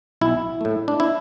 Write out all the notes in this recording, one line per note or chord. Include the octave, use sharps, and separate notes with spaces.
B1 E4
A2 A3
D4
E4